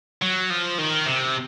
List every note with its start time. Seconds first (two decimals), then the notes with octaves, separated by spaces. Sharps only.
0.22 F#3
0.50 F3
0.78 D#3
1.06 C3